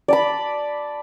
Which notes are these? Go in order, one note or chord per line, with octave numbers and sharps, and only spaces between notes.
D5 A5 B5